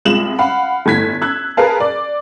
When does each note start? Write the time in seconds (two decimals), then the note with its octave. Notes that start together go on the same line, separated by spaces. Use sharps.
0.05 C2 G#3 F4 E7 F#7
0.39 F5 F#5 B5
0.86 G1 A2 G#6 B6
1.22 E6 F#6 G#6
1.57 G#4 A#4 B4 F5 A5
1.80 D5